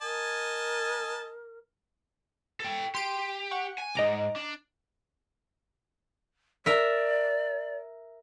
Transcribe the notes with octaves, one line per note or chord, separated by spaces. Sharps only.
A#4 D#5 G#5 A5
A4 G5
G4 C6 D7 D#7
F#5 C#6
G#5
B1 G#2 D#5 A#5 D6
D4
A#4 D5 E5